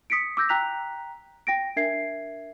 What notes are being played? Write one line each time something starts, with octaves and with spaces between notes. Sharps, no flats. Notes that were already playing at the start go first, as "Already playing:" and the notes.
D#6 B6 C#7 D7
D6 E6 G6 A#6
G5 A#5 F#6 B6 F7
G5 A#6 D7
D4 A#4 E5 G#6 C7